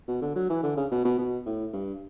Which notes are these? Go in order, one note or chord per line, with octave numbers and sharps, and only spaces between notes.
B2
D3
F#3
E3
D3
C#3
B2
B2
B2
A2
G2